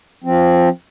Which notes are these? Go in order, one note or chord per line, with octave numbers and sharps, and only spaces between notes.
F3 C4